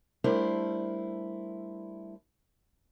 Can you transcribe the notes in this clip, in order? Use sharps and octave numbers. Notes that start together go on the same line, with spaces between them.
G3 A3 D4 E4 A#4 C5